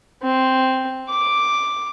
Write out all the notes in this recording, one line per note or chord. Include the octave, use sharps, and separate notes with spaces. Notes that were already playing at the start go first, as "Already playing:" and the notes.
C4
D6